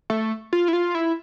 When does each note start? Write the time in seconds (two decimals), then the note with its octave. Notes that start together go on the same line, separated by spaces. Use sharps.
0.10 A3
0.53 F4
0.68 E4
0.73 F4
0.95 E4